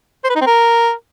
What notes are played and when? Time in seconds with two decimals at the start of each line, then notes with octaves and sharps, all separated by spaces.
0.24 C5
0.30 B4
0.35 D#4
0.41 C4
0.46 A#4